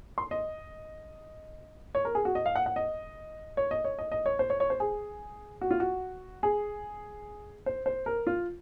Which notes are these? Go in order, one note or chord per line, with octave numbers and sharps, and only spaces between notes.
C6
D#5
C#5
A#4
G#4
F#4
D#5
F5
F#5
F#5
D#5
C#5
D#5
C#5
D#5
D#5
C#5
C5
C#5
C#5
C5
G#4
F#4
F4
F#4
G#4
C5
C5
A#4
F4